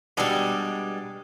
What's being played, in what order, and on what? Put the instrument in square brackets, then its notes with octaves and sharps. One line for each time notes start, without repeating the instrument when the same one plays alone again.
[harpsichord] B2 D4 A4 [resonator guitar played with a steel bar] G3 G#3